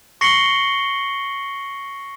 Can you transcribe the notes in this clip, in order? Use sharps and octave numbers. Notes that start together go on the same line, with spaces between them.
C#6 A#6 C7 C#7 F#7 G7